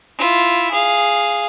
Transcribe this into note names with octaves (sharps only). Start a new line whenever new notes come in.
E4 F4
G#4 F5